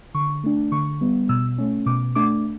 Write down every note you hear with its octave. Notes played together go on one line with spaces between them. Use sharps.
D3 C#6
A3 D4
D3 C#6
G3 B3
B2 E6
A3 C#4
B2 D6
A3 D4 D6